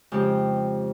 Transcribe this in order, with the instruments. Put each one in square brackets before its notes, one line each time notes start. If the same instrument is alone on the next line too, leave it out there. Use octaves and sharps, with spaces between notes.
[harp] F2 C#3 G#3 G4